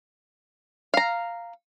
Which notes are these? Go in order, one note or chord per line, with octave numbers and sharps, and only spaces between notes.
F5 A#5